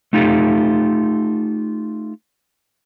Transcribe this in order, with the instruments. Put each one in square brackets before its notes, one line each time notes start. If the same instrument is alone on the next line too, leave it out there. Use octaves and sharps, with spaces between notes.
[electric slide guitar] A3 D#4 F4 G4 A4